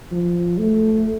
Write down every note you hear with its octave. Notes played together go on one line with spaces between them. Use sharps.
F3
A3